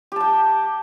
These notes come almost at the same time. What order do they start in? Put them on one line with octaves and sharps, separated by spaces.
G4 A5 G5